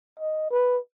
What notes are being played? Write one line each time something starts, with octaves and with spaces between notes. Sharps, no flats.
D#5
B4